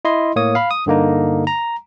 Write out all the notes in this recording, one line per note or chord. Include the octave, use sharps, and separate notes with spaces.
E4 D#5 C6
A2 A#3 C#5 D#6
F5 B5
D#6
G2 D3 A#3 D#4
A#5